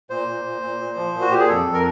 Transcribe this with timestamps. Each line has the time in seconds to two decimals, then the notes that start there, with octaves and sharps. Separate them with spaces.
0.10 A#2 C5
0.28 A#2
0.45 A#2
0.62 A#2
0.80 A#2
0.97 F3
1.14 A#2
1.21 F#4
1.31 A#2 G4
1.39 G#4
1.48 F2 A4
1.66 F2
1.73 A#4